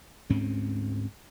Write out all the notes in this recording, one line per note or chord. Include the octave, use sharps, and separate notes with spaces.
D2 G#2 C4 C#4